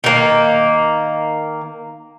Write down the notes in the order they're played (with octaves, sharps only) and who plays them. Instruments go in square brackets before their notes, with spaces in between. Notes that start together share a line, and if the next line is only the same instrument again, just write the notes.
[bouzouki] D#3 A#3